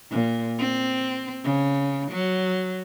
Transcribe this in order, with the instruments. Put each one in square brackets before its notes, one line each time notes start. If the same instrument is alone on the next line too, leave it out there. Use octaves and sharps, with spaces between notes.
[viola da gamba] A#2
C4
C#3
F#3